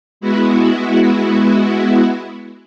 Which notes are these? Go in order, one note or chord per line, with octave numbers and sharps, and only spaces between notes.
G#3 B3 E4 F#4